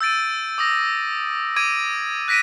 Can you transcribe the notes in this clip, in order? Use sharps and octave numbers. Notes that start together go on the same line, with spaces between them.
E6 G6 A6 D7 D#7
D6 D#6 A#6
D6 G#6 D7 D#7
F#6 A#6 B6 D7 D#7